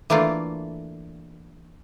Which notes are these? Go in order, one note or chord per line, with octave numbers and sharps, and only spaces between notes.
E3 A3 A#3 D4 F4